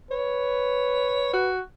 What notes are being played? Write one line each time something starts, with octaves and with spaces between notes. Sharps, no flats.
B4 C#5
F#4